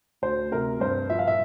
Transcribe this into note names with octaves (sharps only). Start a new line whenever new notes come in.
D2 C5
C3 A#4
G2 C5
F3 E5
F5
E5